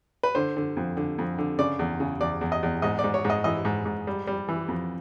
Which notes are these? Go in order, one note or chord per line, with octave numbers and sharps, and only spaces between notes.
B4
D3 C5
D3
F2
D3
F2
D3
C#3 D5
E2
C#3
E2 D5
E2
D#5
E2
G#2 D#5
D5
G#2
C#5
G#2
D#5
E3 D#5
G#2
G#2
G3
G3
E3
F2